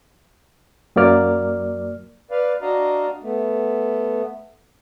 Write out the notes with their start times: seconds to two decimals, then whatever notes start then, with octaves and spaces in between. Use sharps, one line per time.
0.96 F#2 F#3 A#3 D5 F6
2.31 B4 D5 F5
2.62 D4 F#4 D5 D#5 F5 A#5
3.23 A3 B3